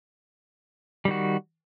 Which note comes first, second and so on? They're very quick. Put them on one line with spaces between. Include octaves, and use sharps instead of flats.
G3 D#3 F#4